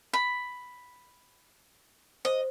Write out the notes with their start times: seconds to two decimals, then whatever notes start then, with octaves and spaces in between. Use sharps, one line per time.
0.13 B5
2.25 C5 D#5